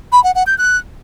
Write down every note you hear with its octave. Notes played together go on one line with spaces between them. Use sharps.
B5
F#5
F#5
G6
F#6